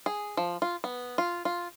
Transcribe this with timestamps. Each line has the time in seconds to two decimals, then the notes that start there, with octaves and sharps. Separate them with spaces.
0.06 G#4
0.37 F3
0.62 F4
0.84 B3
1.18 F4
1.45 F4